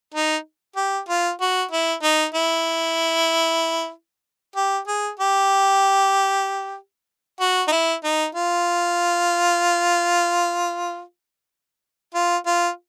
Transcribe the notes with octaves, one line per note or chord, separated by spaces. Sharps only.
D#4
G4
F4
F#4
E4
D#4
E4
G4
G#4
G4
F#4
D#4
E4
D#4
F4
F4
F4